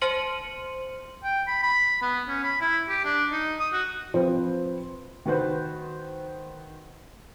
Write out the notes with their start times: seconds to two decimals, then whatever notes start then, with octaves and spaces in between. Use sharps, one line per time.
0.01 C5 C6 F6 C#7 D#7 F#7
1.23 G5
1.47 B5
1.63 B5
2.02 B3
2.28 C#4
2.43 B5
2.61 E4
2.89 G4
3.05 D4
3.32 D#4
3.60 D#6
3.73 F#4
4.14 F3 C4 B4 C5
5.25 D#3 F#4 B4 C5